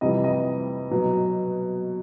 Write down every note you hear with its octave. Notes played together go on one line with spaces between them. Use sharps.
F2 C3 E3 G3 D#5
D#5
B2 F#3